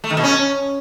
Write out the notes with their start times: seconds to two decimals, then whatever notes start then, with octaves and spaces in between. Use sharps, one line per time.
0.04 A3
0.10 D#3
0.17 B2
0.24 C#4